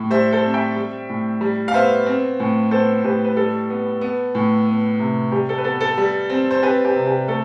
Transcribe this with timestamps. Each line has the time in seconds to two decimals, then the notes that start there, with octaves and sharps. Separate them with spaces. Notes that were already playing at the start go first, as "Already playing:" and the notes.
Already playing: A2
0.10 G3 C5 E5
0.32 A4 C5
0.44 C4
0.54 E5 G5
0.76 G3
1.09 A2
1.41 G3
1.68 F5
1.74 B3 C5 E5
2.06 C4
2.40 A2
2.71 B3 A4 C5
3.04 A2 G4 B4
3.24 B4
3.36 G3 A4
3.70 B3
4.01 B3
4.35 A2
4.67 B3
4.99 C3
5.32 G3 G4
5.49 A4
5.58 B4
5.64 B3 A4
5.81 A4
5.98 G3
6.30 C4
6.51 C5
6.62 C4 G4 B4
6.85 G4
6.96 C3
7.07 G4
7.28 A3 A4